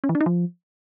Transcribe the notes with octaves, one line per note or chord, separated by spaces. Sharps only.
C#4
E3
D4
D#4
F3